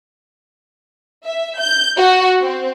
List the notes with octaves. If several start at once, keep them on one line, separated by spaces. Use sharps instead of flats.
E5
G6
F#4
C4